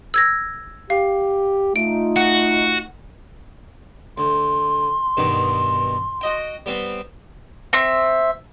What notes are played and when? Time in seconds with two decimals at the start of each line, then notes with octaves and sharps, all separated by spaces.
0.14 E6 G#6 A#6
0.90 G4 F5
1.76 A3 D#4 F4 D7
2.16 F#4 F#5
4.18 D2 C6
5.17 G2 B2 D#3
6.21 F#4 D#5 G5
6.66 G3 B3 C4
7.73 C4 E5